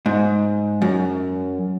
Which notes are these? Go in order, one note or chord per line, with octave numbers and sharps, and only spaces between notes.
G#2
F#2